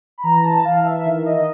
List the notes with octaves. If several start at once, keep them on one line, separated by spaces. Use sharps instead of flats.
B5
E3 A#5
A5
E3 F5
E5
D#3
D#5
D#5